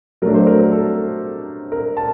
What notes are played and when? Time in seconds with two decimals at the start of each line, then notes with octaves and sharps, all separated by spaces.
0.22 F#3 A3 D4 A#4
0.34 C5
0.47 A#4
0.59 A#4
0.72 A4
1.72 A#4
1.97 A5